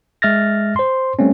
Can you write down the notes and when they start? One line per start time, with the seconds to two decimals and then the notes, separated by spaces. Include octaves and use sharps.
0.22 G#3 E5 F6 A6 A#6
0.76 C5 C6
1.19 G3 A3 C4 C#4